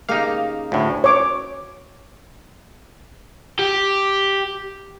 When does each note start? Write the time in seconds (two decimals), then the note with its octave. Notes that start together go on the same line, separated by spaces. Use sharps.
0.09 C#3 A#3 D#4 G4 F5
0.72 D2 A2
1.04 C#5 D6
3.59 G4